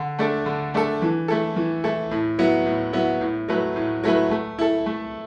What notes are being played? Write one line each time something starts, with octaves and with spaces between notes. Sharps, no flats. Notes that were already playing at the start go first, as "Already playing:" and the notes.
Already playing: D3
A3 D4 A4
D3
A3 D4 A4
E3
A3 E4 A4
E3
A3 E4 A4
A2
F#3 B3 E4
A2
F#3 B3 E4
A2
F#3 A3 E4 B4
A2
F#3 A3 E4 B4
A3
E4 A4
A3